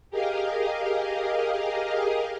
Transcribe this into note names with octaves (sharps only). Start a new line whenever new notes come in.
G4 G#4 A#4 D#5 F5